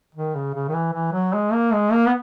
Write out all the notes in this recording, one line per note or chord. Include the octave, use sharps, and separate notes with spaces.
D#3
C#3
C#3
D#3
E3
E3
F#3
G#3
A#3
G#3
A#3
B3